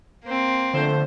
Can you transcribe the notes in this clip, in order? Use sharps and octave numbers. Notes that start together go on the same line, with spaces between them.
A#3 C4
D3 F3 A3 C5